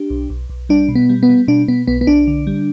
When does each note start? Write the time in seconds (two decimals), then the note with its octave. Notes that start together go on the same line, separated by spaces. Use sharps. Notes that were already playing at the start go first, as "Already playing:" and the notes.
Already playing: D4 G4
0.10 B1
0.30 B1
0.50 B1
0.69 G3 D4
0.89 B2
0.95 B3
1.09 G3
1.23 B3
1.29 G3
1.48 B2 D4
1.68 B2 B3
1.87 B1 B3
2.01 B3
2.07 B1 D4
2.27 D3
2.47 G3